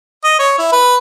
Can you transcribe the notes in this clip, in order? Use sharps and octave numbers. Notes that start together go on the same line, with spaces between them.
D#5
C#5
E4
B4